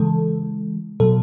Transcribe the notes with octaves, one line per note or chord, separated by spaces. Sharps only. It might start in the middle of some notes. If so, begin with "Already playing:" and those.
Already playing: C#3 E3 G#3 A4
B2 F#3 A4